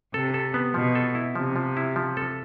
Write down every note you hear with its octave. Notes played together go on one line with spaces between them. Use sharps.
C3 A4
A4
B3
B2 F3
A4
E4
C3 F3
F3
E4
F3
A4